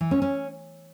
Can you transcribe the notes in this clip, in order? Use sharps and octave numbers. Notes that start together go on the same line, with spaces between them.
E3
C#4
C#4